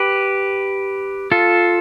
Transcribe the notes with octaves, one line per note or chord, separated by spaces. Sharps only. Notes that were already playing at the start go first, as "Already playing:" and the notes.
Already playing: G4 B4
F4 A4